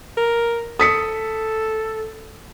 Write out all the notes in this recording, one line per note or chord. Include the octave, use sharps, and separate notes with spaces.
A#4
A4 D#6 B6 C#7